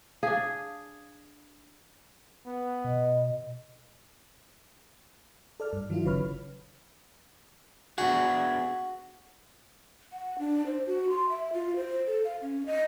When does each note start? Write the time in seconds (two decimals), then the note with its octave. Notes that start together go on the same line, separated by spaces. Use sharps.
0.23 D4 G#4 F5
2.47 B3
2.84 B2 D#5
5.60 A4 D5 F6
5.73 G2
5.90 D#3 F#3 E4 F4
6.05 G1 C#3 B4 C#5 B5 F6
7.98 B3 D4 F#4 G#4
10.13 F#5
10.39 D4
10.66 C5
10.87 F#4
11.10 C6
11.30 E5
11.53 F4
11.76 C5
12.07 A4
12.25 F5
12.42 C#4
12.66 D#5